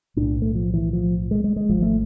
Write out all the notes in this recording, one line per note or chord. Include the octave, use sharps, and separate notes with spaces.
B1 A2 D4
A3
F3
E3
F3
G#3
G#3
G#3
G#1 G#2 F3
A3